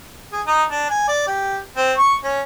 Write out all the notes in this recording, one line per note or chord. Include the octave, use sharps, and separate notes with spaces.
G#4
D#4
D4
G#5
D5
G4
C4
C#6
C#4